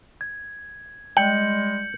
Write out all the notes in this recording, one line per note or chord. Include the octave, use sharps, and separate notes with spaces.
G#6
G3 G#3 G5 G6 C#7 F#7